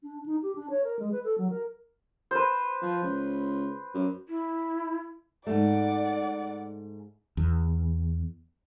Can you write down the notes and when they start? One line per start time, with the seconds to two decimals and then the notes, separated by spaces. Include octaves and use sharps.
0.03 D4
0.26 D#4
0.43 G4
0.56 D4
0.70 C#5
0.84 A#4
0.99 G#3
1.12 B4
1.24 A4
1.38 F#3
1.50 A#4
2.31 B4 C5
2.82 F3
3.03 C#2
3.94 F#2
4.28 E4
5.47 G#2 A3 D5 F#5
7.37 E2